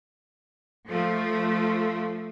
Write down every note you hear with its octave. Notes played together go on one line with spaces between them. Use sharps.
F3 A3